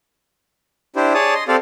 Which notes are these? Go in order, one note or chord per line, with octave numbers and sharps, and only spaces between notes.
D4 E4 G4 C5
G#4 C#5 D5 A5 D#6
D#5 C6
C4 G4 A4 C5 D5 F5